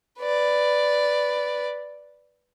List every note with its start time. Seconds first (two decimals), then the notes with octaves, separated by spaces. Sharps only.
0.20 B4 D5